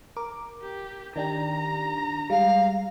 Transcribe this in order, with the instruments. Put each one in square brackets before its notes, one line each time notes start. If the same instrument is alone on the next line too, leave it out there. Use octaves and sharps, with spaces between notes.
[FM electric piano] A#4 D6
[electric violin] G4
[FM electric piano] D#3 D4 G4 [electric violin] A#5
[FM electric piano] G3 G#3 [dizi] F5